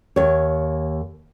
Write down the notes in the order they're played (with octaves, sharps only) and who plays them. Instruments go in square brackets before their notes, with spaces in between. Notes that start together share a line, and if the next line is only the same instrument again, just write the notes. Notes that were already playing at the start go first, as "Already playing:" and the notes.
[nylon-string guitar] D#2 C#5